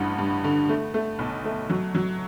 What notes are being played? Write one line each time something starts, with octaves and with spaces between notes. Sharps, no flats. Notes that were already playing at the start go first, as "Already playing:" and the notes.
Already playing: A1 G2
G2
D3
A3
A3
B1
A3
F#3
F#3